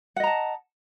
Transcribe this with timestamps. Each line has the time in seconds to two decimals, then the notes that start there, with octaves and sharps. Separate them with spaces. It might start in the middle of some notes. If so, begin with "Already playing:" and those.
0.16 F#5
0.20 D#5
0.24 A#5
0.27 A5